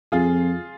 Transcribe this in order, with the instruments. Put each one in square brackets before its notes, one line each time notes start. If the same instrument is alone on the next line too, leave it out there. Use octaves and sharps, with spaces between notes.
[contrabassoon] F2 [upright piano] F4 G#4